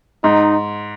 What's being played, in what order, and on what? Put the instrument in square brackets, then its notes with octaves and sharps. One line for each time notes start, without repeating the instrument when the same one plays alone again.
[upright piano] G#2 [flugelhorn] D#4